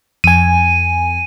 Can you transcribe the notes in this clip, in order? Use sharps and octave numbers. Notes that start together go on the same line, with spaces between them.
F2 G#5 D#7